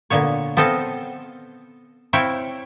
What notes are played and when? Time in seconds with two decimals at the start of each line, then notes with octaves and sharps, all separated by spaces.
0.10 A#2 D3 B3 C#5
0.57 B3 C4 A4 D#5 F5
2.13 C4 E4 C#5 F5 G5